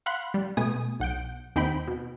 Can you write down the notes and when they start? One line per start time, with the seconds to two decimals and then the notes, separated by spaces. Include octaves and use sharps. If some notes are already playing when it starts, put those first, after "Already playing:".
0.06 F5 F#5 B5 C6 F#6
0.34 G3
0.57 B2 A3 G#5 D#6
1.00 B1 F#5 G6 D7
1.56 D#2 C4 D#4 G5 B5
1.88 B2